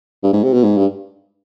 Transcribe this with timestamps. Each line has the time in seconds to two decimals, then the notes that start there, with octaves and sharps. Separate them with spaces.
0.23 G2
0.33 G#2
0.43 C3
0.53 B2
0.63 G#2
0.77 G2